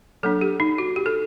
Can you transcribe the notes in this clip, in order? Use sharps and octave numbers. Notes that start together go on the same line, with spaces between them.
F#3 A#3 D4 A4
G4
D#4
F#4
G4
A4